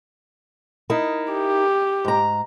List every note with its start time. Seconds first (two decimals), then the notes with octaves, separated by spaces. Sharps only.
0.90 D#4 E4 A#4
1.33 G4
2.05 G#2 A#5